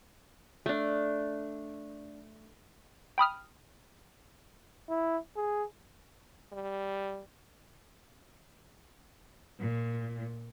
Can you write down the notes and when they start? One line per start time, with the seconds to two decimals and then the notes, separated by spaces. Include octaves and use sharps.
0.66 A3 D4
3.18 G5 B5 D#6 F6
4.89 E4
5.36 G#4
6.53 G3
9.59 A#2